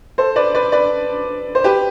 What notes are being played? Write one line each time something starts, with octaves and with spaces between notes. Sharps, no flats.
A4 C5
B4 D5
B4 D5
B4 D5
C5
G4 B4